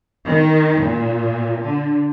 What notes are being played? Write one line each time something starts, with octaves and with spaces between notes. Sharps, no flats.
D#3
A#2
D3